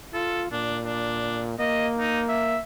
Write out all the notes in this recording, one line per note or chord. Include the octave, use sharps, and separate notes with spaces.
F4 A4
A#2 D4
D4
A#3 D#5
D#4
E5